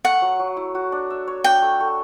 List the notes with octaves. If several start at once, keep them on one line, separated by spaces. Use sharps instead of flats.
A3 F#5
F#3
F#3
E4
F#4
D4
E5
C#5
D4 G5
A3
A3